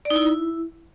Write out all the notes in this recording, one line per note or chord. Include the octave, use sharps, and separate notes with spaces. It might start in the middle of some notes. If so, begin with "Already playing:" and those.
D5
D#4
E4